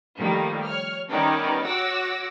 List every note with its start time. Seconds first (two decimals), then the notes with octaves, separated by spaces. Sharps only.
0.18 D#3 F3 G3 A3 A#3
0.65 C#5 F6
1.09 D#3 G3 B3 C#4 D#4 D5
1.65 F#4 C#5 F#5 D6 E6 A#6